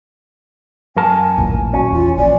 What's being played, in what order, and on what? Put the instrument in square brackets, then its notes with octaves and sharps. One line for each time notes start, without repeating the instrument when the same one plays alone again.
[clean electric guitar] F#2 A#4 A5 [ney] G#5
[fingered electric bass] A1 D#2 A#2
[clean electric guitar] C#4 [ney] F#4
[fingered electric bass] E2 [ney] F4
[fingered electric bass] A#1 [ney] D5